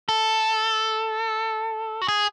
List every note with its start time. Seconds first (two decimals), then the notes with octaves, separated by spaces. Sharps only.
0.09 A4
2.01 F#4
2.08 G#4